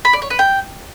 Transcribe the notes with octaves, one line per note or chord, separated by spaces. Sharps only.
B5
D5
C#5
B4
G5